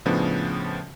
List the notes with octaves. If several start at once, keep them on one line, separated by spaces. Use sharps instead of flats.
A2 C#3 F3 B3 D4